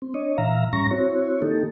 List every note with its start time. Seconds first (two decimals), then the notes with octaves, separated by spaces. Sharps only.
0.02 C4
0.14 D4 C#5 D#5
0.38 A#2 E3 E5 F5 A#5
0.73 G#2 G3 C#4 A#5 C#6 A#6
0.91 C4 E4 F#4 C#5
1.42 D#3 A#3 D#4 G4 A4